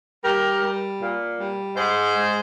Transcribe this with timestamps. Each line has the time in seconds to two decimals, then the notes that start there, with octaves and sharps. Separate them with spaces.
0.23 G3 G4 A#4
0.61 G3
1.01 A#2
1.39 G3
1.76 G#2 G#4 C5
2.15 G#3